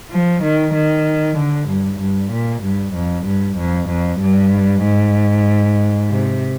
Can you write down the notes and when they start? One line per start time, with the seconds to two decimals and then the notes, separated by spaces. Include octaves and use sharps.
0.11 F3
0.43 D#3
0.74 D#3
1.37 D3
1.68 G2
1.99 G2
2.32 A#2
2.63 G2
2.94 F2
3.26 G2
3.57 F2
3.89 F2
4.20 G2
4.83 G#2
6.09 C3